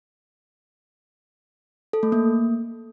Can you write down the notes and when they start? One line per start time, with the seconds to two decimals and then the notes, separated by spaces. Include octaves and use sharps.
1.93 A4
2.03 A3
2.12 A#3